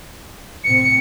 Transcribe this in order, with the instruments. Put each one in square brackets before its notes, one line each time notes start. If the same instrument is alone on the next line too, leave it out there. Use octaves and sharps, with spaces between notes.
[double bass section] A2 C3 C4 [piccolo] C#7